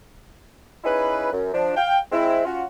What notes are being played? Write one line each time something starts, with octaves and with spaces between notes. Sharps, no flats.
C#4 D#4 E4 G#4 B4
F#2
F3 D4
F5 G5
G#3 C4 E4
C#4 F4 F#4